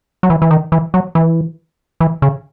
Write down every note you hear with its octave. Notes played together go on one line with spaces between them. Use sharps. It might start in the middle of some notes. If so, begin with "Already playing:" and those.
F#3
E3
E3
D#3
E3
F#3
E3
E3
C#3